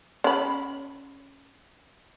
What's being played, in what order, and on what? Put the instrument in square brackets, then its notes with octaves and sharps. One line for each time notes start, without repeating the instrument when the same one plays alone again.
[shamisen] C#4 B5